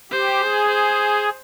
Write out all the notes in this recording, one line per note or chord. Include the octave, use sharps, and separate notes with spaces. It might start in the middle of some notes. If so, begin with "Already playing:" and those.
G4 C5
G#4
C5